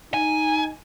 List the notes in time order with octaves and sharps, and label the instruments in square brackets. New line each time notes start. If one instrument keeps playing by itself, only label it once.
[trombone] D#4 [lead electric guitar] G#5